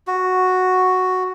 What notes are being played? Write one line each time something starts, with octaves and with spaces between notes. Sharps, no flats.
F#4